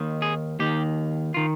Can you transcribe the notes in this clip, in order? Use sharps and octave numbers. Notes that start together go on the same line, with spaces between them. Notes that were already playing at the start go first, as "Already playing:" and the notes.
Already playing: D#2 D#3
G#4
D#2 D#3 G4
D#3 F4